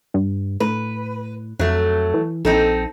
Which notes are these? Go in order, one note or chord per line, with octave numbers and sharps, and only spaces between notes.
G2
A2 B4
F2 F#3 A3
E3
A#1 C4 D#4 A4